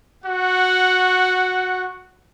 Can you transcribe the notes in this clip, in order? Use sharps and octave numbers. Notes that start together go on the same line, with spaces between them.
F#4 F#5